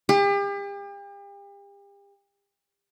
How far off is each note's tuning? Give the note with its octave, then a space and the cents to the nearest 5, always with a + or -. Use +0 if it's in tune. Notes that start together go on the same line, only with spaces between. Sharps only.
G4 +40